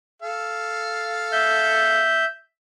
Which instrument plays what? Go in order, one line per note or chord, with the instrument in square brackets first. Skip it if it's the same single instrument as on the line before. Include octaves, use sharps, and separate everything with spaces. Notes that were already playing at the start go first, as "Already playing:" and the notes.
[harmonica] A4 F5
[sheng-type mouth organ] E5 G6